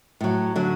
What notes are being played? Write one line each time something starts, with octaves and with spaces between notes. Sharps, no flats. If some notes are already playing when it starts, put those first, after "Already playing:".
A2 F#3
D3 F#3